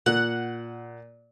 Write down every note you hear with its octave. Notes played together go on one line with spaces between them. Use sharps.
A#2 F#5